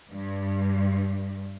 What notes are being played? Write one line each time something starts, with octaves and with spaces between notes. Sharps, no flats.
G2